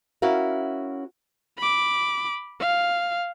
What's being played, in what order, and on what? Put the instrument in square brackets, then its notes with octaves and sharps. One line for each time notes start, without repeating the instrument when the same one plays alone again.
[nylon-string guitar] C#4 E4 F#4 A#4 F5
[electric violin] B5 D6
F5